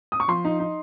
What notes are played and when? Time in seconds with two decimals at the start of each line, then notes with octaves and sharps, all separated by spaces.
0.12 D#6
0.20 C#6
0.28 F3 C6
0.45 D#4
0.60 D#4